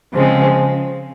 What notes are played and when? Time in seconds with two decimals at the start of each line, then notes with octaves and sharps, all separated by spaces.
0.14 C#3 F3 G#3 C4